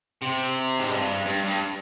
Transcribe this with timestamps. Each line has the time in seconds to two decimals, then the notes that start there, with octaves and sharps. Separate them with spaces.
0.22 C3
0.79 G#2
0.91 G2
1.26 G2
1.43 G2